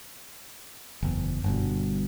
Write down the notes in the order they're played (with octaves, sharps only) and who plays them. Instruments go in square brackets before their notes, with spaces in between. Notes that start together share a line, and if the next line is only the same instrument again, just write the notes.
[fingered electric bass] F#1 E2
G1 G2 B2